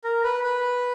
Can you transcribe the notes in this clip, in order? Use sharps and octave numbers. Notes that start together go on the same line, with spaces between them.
A#4
B4
B4